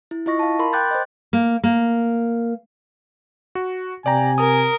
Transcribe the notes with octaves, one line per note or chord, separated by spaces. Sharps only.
E4
E4 F4 D#5 C#6 A#6
F5 A5
A#4 B5 C6
G5 C6 D6 F#6 G6 A6
C5 D#5
A#3
A#3
F#4
C3 D5 G5 G#5 A#5
A#4 D#6